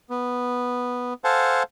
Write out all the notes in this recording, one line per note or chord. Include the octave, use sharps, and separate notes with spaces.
B3
A4 C5 F5 F#5 G#5 A5